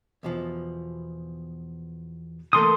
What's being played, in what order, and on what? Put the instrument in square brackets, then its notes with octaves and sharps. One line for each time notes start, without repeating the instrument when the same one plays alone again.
[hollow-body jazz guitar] E2 B2 F3
[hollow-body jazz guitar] E3 A3 A#3 [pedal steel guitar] A4 C6 D#6